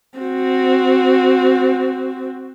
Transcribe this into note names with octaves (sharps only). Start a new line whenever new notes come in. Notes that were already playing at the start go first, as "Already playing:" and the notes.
C4 F#4